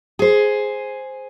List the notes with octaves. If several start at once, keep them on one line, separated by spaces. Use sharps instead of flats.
G#4 C5